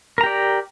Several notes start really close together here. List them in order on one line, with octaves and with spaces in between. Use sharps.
A#4 A#5 G4 D5